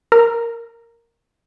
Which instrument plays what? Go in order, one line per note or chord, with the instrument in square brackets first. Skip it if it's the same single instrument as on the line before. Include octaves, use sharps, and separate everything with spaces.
[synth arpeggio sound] A#4